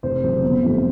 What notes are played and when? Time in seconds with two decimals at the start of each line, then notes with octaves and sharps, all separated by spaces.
0.03 F1 C5
0.22 F2 C#3 F#3
0.43 G1
0.63 F2 C3 F3 A3